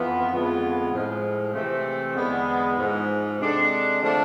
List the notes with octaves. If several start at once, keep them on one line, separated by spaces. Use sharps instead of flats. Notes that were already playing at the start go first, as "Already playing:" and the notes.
Already playing: F2 E3 B3 F4
F2 D3 G#3 B3 F4
A2 F3 G#3
C3 E3 A3 C4
E2 D3 G#3 B3
G#2 F3 G#3
C3 G#3 D4 A4
D3 F3 A3 D4